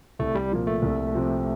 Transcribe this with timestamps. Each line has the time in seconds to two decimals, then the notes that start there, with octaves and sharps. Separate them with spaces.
0.19 C2 A3
0.35 G3
0.52 A#2 F3 A#3
0.67 A3
0.82 C2
1.14 C3 F3 C4 G4